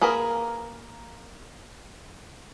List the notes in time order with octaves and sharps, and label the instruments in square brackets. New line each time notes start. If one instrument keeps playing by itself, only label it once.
[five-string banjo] A#3 G#4 A#4 B4